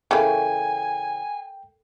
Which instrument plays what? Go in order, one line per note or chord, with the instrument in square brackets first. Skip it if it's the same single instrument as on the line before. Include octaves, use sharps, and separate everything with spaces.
[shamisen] C#3 E3 [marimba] A4 A#4 [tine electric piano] G5 [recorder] G#5